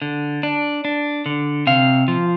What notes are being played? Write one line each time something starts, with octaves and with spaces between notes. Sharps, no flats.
D3
D4
D4
D3
C3 F5
F3